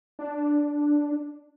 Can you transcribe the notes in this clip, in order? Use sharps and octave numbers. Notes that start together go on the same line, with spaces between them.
D4